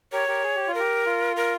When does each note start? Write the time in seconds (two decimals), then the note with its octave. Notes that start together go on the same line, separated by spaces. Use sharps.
0.12 G4 A#4 C#5
0.28 G4 A#4
0.44 G#4
0.56 G4
0.68 F4
0.74 G4 A#4
1.06 F4
1.36 A#4